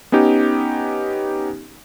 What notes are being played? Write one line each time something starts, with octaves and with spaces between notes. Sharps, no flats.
B3 C#4 D#4 G4